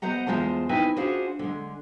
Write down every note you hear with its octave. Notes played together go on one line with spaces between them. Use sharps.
B3 C5 D#5 F#5 A#5
E2 C#3 G#3 F4 C5 A5
C4 D#4 E4 B4 G#5
C#4 D4 F4 F#4 G#4 C5
D3 G#3